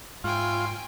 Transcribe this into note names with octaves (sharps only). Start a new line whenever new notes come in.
G#2 E4 F4 C#5 G5 G#5 C6